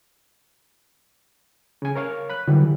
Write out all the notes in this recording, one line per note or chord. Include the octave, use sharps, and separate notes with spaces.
C#3 G#5
A#4 C#5 F5
B5 F#6
D3 E3 F#3 G3